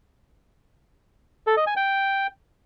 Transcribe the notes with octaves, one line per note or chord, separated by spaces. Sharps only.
A4
D#5
G#5
G5